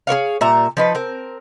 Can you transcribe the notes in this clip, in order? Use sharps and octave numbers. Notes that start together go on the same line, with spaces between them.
G#4 A#4 C#5 F5
A#2 G3 E5 A#5
F3 D#4 B4
C4 A#4